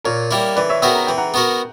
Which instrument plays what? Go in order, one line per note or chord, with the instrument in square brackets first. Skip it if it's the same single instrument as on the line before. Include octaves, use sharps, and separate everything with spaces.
[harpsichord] A#2 [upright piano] A#4 C#5
[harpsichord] G3 A#3 E4
[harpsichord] E3 [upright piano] B4 D5
[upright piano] C#5 E5
[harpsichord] B3 F#4 A#4 [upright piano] E5 G5
[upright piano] A#5
[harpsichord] E3 [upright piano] G5
[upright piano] F#5 A#5
[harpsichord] B3 F#4 A#4